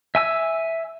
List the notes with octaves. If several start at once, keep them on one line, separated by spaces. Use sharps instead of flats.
E5 G#5 E6